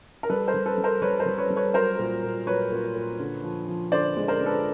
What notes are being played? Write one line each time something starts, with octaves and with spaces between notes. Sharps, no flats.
A#4
G3 A4 B4
A#4 C5
G3
A4 B4
G3
A#4 C5
G3 B4 C#5
A#4 C5
G3
B4 C#5
G3
B4 C#5
F#3 A#4 C5
A#2
A#2
F#3 B4 C#5
A#2
A#2
D3
F3
F3
D3 C5 D5
G#3
A#4 C5
D3
A4 B4